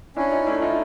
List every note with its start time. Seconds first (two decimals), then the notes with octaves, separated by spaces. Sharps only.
0.17 C#4 D4 E4
0.32 D#4 F4
0.47 A3 D4 E4
0.62 D#4 F4